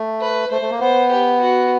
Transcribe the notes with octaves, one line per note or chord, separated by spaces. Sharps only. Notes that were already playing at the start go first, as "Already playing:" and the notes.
Already playing: A3
B4
A3 C5
A3
A#3
B3 C5
G4
F#4